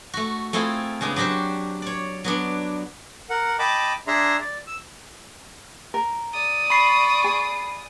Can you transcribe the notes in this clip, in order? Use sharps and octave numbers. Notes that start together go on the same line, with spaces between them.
A3 F#4
A3 C4 E4 F4 G#4
C#3 G#3 B3 D4
F#3 D4 F#4 G4 C5
C#5 D5
F#3 B3 D4
A#4 F#5
D#5 G5 A5 B5 D6
D4 G#4 E5 A#5 C6
D5
E6
A#4
D5 D#6
B5 C#6 C7
G#4